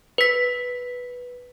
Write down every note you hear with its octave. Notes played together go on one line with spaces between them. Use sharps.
B4 B6